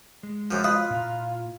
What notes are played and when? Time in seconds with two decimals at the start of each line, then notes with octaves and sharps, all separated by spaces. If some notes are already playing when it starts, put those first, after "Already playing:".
0.23 G#3
0.51 F#2 F3
0.64 F4 B4 D#5 D#6
0.90 A#2 E4 A#5